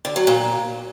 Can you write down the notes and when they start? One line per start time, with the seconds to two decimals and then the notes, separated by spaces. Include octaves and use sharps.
0.05 D3
0.16 F#3
0.27 A#2